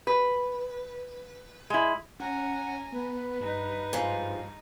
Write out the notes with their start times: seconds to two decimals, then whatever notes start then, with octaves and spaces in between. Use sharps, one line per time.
0.07 B4
1.70 G#3 E4
2.20 C#4 F#5 G#5 A#5
2.92 B3 B4
3.41 G2 D#4
3.93 G#2 F3